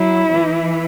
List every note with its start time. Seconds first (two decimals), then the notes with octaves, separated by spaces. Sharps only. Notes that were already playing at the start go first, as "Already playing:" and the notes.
Already playing: F#3 E4
0.33 E3